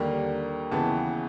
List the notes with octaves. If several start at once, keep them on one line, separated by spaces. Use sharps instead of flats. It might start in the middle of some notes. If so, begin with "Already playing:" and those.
Already playing: D#2 D3 G3 A#3
D#2 C#3 E3 G#3 B3 A5